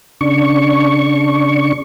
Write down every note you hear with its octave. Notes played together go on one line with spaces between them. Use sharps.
C#3 D4 C#6